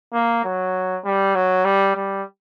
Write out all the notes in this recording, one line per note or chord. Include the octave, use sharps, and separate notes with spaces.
A#3
F#3
G3
F#3
G3
G3